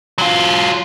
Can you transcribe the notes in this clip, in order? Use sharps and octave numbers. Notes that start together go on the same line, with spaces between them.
F#3 F4